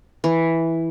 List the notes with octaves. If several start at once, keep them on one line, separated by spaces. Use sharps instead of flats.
E3